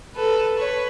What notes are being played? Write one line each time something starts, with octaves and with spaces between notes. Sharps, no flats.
A4 B4
B4 C#5